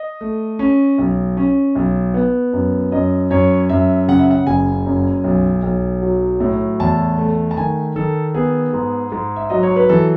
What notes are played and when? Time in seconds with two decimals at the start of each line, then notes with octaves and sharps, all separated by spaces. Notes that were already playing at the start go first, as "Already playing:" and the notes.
Already playing: D#5
0.21 A3
0.59 C#4
0.98 B1
1.37 C#4
1.75 B1
2.14 B3
2.53 F#2
2.92 F#2 D#5
3.30 F#2 C#5
3.69 F#2 E5
4.08 C#3 F#5
4.19 E5
4.31 F#5
4.47 F#1 G#5
4.86 F#2
5.24 B1
5.63 B1
6.02 F#3
6.40 A2
6.80 E2 A5
7.18 A3
7.51 A5
7.57 D#3 G#5
7.96 D#3 A4
8.34 B3 G#4
8.73 G#2
9.12 G#2
9.36 E5
9.50 F#3 D#5
9.63 C#5
9.76 B4
9.89 E3 A4